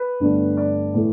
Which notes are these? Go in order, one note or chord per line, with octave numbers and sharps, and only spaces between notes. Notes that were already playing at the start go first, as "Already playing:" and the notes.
Already playing: B4
G1 G2 D3 A3 D4
D5
A2 E3 A3